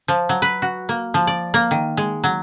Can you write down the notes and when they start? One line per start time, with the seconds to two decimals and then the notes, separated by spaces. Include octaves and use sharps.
0.08 F3
0.29 F#3
0.42 B4
0.62 F#4
0.89 A#3
1.14 F3
1.27 D5
1.54 A#3
1.71 D#3
1.97 G#3
2.24 F#3